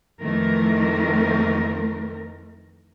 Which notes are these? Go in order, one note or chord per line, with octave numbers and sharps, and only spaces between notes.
F2 D#3 E3 A3 A#4